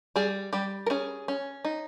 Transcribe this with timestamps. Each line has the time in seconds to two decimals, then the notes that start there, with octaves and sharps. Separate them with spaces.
0.16 G3 G#4
0.53 G3 G4
0.86 A#4
0.90 C#4 G#4
1.28 C#4
1.65 D#4